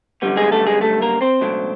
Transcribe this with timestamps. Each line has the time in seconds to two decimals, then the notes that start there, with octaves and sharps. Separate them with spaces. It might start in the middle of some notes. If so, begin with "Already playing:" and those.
0.22 F#2 D3 G3 B3
0.37 G#3 G#4
0.52 A3 A4
0.67 G#3 G#4
0.81 A3 A4
1.01 A#3 A#4
1.21 C4 C5
1.41 C#2 B2 F#3 A3 D4